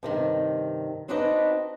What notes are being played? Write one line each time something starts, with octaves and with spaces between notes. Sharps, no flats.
G2 C3 D#3
C4 D4 D#4 F#4 B4 D#5